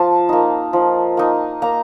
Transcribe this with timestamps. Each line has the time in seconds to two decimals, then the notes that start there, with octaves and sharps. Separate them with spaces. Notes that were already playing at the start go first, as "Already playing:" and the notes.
Already playing: F3 A5
0.29 A#3 D#4
0.73 F3
1.17 A#3 D#4
1.62 A#3 A#5